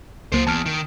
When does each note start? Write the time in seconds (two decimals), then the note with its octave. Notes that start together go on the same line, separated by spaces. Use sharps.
0.32 C#2 F#3 A#3 C5
0.47 E2 A5 F6
0.66 D#3